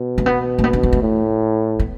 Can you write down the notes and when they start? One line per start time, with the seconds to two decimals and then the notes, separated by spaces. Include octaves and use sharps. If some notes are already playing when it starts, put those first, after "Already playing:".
Already playing: B2
0.18 A3
0.26 B3
0.58 A3
0.64 B3
0.73 D4
0.83 C4
0.93 A3
1.03 A2
1.80 B3